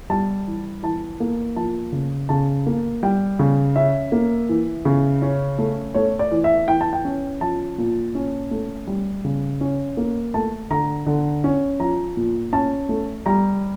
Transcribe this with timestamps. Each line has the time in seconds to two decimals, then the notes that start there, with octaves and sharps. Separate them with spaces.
0.10 G3 A5
0.47 E3
0.83 E3 A5
1.20 A#3
1.56 F3 A5
1.92 C#3
2.29 C#3 A5
2.66 A#3
3.03 G3 G5
3.39 C#3
3.76 C#4 E5
4.12 A#3
4.49 E3
4.85 C#3
5.22 C#4
5.58 A3
5.94 A3 C#5
6.19 D5
6.31 E3
6.44 E5
6.68 E3 G5
6.81 A5
6.93 G5
7.05 C#4
7.41 F3 A5
7.78 A#2
8.15 C#4
8.51 A3
8.87 G3
9.24 C#3
9.61 C#4
9.97 A#3
10.34 A3 A5
10.70 D3 A#5
11.06 D3
11.44 C#4
11.80 F3 A#5
12.17 A#2
12.53 C#4 A5
12.89 A3
13.26 G3 A#5